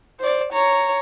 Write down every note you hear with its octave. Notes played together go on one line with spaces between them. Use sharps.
C5 D5
C#5 A#5